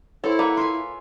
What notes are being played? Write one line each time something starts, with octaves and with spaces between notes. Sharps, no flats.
E4 A4 C5 C#5
A#3 B4 C#5 F#5
F4 E5 G#5